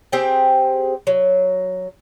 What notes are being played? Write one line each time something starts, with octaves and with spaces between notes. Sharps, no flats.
C4 G4 G#4 G5
F#3